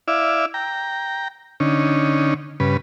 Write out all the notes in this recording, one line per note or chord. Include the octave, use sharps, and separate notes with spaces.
E4 D5 E5 F5
G5 A#5
D3 C#4 D#4
G2 C#3 B4